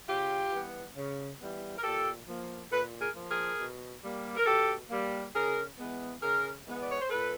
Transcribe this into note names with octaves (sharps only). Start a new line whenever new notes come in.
C#3 F4 G4
E3 G3 B3
C#3
E3 G3 B3
A#4
A#2 G4 A4
F3 A#3
A#2 A4 B4
G#4 A#4
F3 A#3
G#4 A#4
B2
G3 A#3
A#4
B2 G4 A4
G3 A#3
C#3 G#4 A#4
E3 G#3 B3
C#3 G#4 A#4
E3 G#3 B3
D5
C#5
C5
A#2 A4 B4